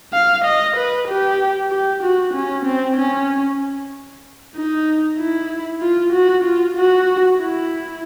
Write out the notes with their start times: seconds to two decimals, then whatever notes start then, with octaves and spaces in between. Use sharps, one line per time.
0.13 F5
0.45 D#5
0.77 B4
1.08 G4
1.71 G4
2.03 F#4
2.34 C#4
2.65 C4
2.97 C#4
4.56 D#4
5.18 E4
5.82 F4
6.13 F#4
6.44 F4
6.76 F#4
7.40 E4